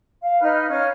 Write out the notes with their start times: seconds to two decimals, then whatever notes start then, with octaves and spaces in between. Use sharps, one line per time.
0.21 F5
0.40 D#4 B4 F6
0.68 C#4 C#5 F5 F6